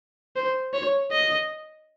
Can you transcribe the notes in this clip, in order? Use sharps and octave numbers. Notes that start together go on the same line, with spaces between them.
C5
C#5
D#5